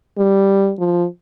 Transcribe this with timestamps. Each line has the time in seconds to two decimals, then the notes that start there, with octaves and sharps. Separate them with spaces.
0.18 G3
0.79 F3